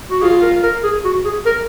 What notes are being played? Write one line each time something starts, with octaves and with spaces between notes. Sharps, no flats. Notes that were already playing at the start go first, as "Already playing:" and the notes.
F#4
F4 G#4
A#4
A#4
G#4
F#4
G#4
A#4